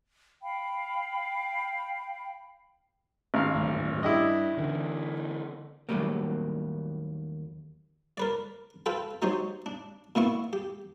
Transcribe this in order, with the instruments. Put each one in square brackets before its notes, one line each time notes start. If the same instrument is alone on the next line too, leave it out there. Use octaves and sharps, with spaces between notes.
[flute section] F5 G5 B5
[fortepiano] G#1 F5
[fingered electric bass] G1 D#2 A2
[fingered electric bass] G2 [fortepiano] E4 G4 D#5
[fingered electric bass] D3 E3
[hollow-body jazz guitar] D#2 G#2 F#3 G3 A3 A#3
[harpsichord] A#4 B4 D5
F4 A4 B4 G5
F#3 D#4 G4 C5 C#5
D4
A#2 B3 E4 C#6
G4